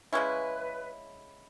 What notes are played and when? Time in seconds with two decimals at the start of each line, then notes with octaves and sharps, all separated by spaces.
0.13 C#3 G#3 C#4 E4 B4